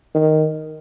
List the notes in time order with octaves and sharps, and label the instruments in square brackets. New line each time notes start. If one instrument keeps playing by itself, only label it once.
[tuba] D#3